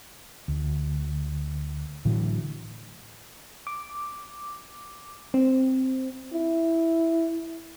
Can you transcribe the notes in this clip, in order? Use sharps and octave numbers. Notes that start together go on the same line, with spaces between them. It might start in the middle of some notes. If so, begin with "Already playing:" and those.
D2
A2 D3 E3 F#3
D6
C4
E4